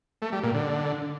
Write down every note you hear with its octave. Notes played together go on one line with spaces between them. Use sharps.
A3
G3
A#2
D3